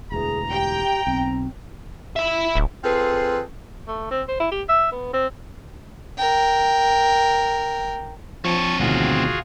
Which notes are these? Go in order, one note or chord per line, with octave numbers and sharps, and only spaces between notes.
E1 D2 E3 G#4 A#5
G4 G5
B1 C4
E5 B5
D1
C4 F4 G#4 A4 B4
A3
C4
C5
E4
G4
E5
B3
C4
A#4 G5
F3 C4 C#5 A5 C#6
D2 B2 D#3 F4 F#4 G#4